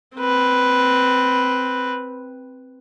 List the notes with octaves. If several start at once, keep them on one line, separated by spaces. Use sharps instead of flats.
C4 B4